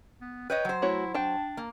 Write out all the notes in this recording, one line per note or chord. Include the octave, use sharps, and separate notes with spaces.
B3
B4 C#5 D#5 G5
F#3 C5
A3 E4 F#4 C#5
D4 G5 A5
A#3